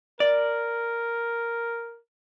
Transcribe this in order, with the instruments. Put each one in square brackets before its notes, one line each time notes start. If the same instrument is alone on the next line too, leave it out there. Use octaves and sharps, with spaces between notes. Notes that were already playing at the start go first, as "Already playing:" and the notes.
[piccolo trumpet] A#4 [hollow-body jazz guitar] D5